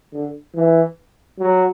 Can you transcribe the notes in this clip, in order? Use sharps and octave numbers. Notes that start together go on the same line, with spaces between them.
D3
E3
F#3